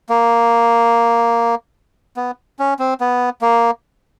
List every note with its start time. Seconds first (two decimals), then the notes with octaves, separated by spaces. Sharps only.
0.09 A#3
2.17 B3
2.59 C#4
2.79 C4
3.00 B3
3.42 A#3